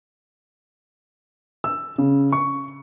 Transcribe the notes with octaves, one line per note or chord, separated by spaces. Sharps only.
E6
C#3
C#6